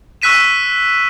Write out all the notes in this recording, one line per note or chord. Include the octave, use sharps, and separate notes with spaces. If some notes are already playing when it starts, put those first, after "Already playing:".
C#6 E6 F#6 B6 D#7 E7